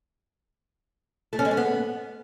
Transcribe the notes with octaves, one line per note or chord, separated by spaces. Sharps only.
A3
C#4
G#3
C#4
B3